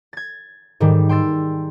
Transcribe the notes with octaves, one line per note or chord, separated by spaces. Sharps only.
G#6 A6
G#2 D#3 G3
G5 C6 E6 A6